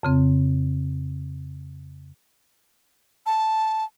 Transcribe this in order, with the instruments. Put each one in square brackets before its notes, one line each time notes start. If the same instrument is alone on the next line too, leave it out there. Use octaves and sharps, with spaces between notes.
[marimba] F2 C#3 C4
[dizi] A5